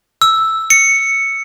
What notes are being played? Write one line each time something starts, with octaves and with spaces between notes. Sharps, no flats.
E6
C#7